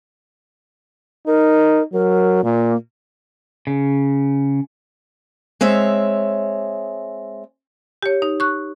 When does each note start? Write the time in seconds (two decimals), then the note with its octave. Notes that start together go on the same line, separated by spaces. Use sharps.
1.27 D#4 A#4
1.93 F#3 A#4
2.44 A#2 A#3
3.67 C#3
5.61 G#3 C4 C#5 E5
8.02 G4 C#5
8.22 D#4
8.40 C#6 F#6